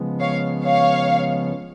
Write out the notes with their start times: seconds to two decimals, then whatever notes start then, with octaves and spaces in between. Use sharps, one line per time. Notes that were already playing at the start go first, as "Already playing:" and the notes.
Already playing: C#3 F3 G#3 B3
0.20 C#5 F5
0.64 C#5 F5